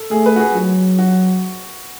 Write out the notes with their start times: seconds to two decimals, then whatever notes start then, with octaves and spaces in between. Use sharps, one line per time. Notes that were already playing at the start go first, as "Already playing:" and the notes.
Already playing: A4
0.11 A3 G#4
0.26 B4
0.36 F#4
0.40 G#4
0.54 F#3 F#4
0.99 F#4